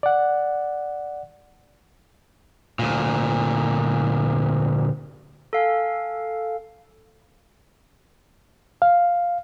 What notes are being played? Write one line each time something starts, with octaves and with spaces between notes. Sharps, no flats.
D5 F#5
D2 A#2
A4 F5 G#5
F5